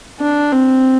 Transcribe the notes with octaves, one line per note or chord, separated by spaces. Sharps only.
D4
C4